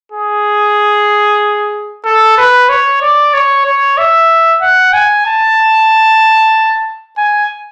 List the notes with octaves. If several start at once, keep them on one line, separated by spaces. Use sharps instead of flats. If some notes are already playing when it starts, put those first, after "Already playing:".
G#4
A4
B4
C#5
D5
C#5
C#5
E5
F#5
G#5
A5
G#5